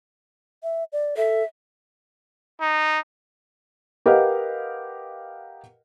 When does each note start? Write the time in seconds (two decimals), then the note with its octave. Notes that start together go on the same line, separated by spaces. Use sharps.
0.63 E5
0.93 D5
1.17 A4 E5
2.61 D#4
4.06 G4 A#4 B4 D#5 F5 F#5